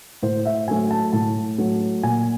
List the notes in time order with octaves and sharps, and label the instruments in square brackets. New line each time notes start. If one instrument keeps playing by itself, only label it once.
[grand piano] A2 C5
E5
F#3 A3 G#5
A5
A2 A5
F#3 A3
A#2 G#5